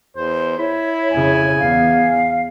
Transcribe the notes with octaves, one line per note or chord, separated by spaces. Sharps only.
E2 C5
E4 C#5 B5
F2 C#3 G#5
E2 F5